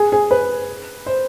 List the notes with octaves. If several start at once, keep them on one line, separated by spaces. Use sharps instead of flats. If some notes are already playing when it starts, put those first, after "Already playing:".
Already playing: G#4
G#4
B4
C5